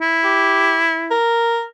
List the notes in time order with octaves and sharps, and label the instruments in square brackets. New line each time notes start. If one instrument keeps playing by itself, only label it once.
[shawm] E4
[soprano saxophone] G4
A#4